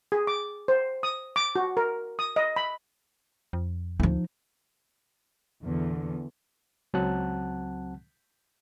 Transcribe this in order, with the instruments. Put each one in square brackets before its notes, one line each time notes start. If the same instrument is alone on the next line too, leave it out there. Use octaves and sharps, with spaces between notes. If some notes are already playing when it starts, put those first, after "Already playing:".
[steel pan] G#4
D6
C5
D#6
D6
F#4
A#4
D#6
D#5
B5
[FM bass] F2
[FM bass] D2 [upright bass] F3 D#4
[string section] E2 [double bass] D3
[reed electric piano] C#2 F#3 C4 F#5 A5 F#6